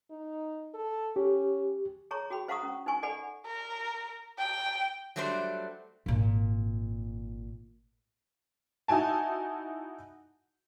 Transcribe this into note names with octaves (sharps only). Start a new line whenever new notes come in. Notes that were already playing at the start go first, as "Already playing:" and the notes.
D#4
A4
C#4 G4
G#4 C#5 A#5 C#6
F#4 G#4 G5 B5
C5 F5 F#5 A#5 C#6 D#6
C#4
D#4 C5 G#5 C#6
A4 D5 F#5 G#5 B5
A#4
G5
F#3 G3 A3 D4 C5
G#1 A#2
D#4 E4 F#4 G#5 A5